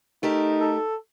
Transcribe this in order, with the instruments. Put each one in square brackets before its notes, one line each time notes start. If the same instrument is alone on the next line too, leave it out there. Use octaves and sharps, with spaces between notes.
[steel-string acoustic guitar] A3 G4 A#4 [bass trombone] D#4
[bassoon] A4